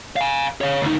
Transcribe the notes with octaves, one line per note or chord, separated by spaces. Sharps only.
F5 G#5
C#5 F5
D2 D#4